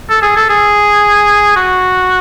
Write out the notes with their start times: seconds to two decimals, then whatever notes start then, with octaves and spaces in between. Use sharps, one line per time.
0.10 A4
0.22 G#4
0.36 A4
0.50 G#4
1.56 F#4